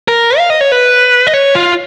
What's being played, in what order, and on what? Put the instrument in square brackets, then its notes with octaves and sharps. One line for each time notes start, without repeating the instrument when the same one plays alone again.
[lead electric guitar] A#4
F5
D#5
C#5
B4
D#5
C#5
F4